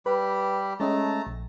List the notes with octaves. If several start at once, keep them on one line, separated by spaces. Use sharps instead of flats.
G3 G4 B4 B5
G#3 A3 C#4 D#5 A5 A#5
A#1